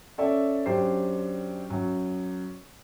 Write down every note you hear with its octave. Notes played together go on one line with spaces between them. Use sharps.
C#4 A4 D5 E5
F#2 D4 G4 C5 C7
F#2 F#3